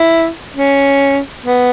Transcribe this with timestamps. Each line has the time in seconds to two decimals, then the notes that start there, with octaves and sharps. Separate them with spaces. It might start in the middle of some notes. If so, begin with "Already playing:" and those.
Already playing: E4
0.56 C#4
1.46 B3